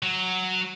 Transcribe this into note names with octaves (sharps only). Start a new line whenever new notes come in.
F#3